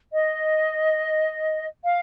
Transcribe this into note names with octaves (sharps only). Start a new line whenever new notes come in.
D#5
F5